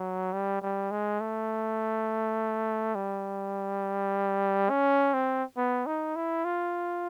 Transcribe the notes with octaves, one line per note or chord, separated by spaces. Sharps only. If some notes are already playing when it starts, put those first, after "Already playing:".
Already playing: F#3
G3
G3
G#3
A3
G3
C#4
C4
B3
D#4
E4
F4